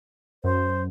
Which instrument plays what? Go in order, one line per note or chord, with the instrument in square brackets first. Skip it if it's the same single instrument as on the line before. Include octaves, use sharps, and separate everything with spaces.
[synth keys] F#2 [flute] C5